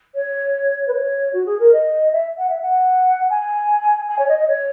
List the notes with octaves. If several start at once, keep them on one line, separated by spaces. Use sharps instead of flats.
C#5
B4
C#5
F#4
G#4
A#4
D#5
E5
F#5
E5
F#5
G#5
G#5
C#5
D#5
D#5
C#5